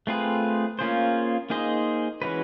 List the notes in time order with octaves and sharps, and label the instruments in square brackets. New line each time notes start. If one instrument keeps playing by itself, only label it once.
[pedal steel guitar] A3 C4 F4 G#4 B4
A#3 C#4 F4 G#4 C5
A#3 D#4 G#4 C5 D#5
E3 G#3 C#4 F#4 B4